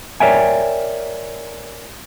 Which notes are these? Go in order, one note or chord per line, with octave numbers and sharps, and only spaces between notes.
A#4 C#5 D5 E5 G5 G#5